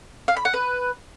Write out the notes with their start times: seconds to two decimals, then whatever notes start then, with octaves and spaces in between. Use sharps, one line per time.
0.28 F5
0.37 B5
0.45 F#5
0.54 B4